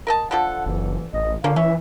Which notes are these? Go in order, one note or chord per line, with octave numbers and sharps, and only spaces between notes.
A#4 D#5 A5
D3 F3 A4 F#5
F#1 E3
A1 D#5
D3 F3 A#3 C#4 F5
E3 C#4 E5